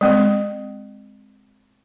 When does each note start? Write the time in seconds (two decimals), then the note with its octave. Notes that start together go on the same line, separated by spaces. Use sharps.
0.01 G#3 C4